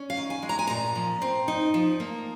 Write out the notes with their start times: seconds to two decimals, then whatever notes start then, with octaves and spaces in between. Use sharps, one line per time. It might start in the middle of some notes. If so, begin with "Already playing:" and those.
Already playing: C#4
0.10 F5
0.17 D#3
0.30 G#5
0.43 G#3
0.49 A#5
0.59 G#5
0.67 A#2 A#5
0.95 F3
1.22 C4
1.48 D#4
1.74 F3
2.00 A#3